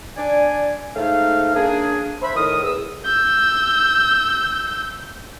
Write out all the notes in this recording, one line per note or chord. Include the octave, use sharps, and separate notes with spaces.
D4 D5 G#5
G#2 A3 D#4 F5
C#3 A#3 D4 G#4
C5 E5 B5
A2 D#3 A#4 D#6
E2 G#4 E6
E6 G6